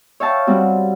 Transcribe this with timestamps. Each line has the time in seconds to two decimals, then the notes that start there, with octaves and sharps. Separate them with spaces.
0.20 C#5 E5 F5 G5 A5
0.47 G3 C4 F#4